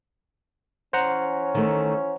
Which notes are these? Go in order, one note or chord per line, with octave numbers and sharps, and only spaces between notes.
E3 C#4 C5 F#5 A#5
D#3 A3